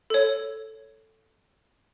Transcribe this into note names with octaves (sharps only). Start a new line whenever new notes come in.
A4 C#5